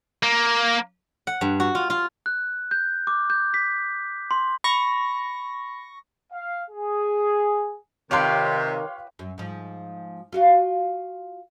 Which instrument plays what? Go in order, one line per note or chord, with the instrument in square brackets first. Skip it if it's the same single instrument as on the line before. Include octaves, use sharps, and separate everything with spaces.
[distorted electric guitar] A#3
[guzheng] F#5
G2
F#4
F4
F4
[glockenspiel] F#6
G6
D6
G6
B6
C6
[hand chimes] B5 [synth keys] C#6 A#6
[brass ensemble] F5
G#4
[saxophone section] C3 [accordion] D#3 [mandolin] F4 G4 B4 [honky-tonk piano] C#5 F5 C6
[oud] F#2
G#2 F3
F4 F#4 F5